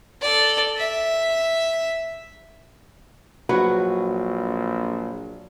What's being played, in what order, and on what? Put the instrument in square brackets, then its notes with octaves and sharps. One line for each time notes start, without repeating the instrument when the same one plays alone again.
[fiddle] A4 D5
E5
[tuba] A#1 [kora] F#3 F#4 B4